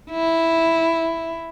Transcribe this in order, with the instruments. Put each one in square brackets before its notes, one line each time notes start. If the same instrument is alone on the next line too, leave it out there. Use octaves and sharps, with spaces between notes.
[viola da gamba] E4